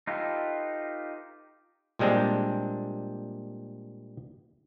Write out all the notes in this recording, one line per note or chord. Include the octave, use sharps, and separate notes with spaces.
D#4 F4 G4 A4 B4
A#2 G3 G#3 C4 D4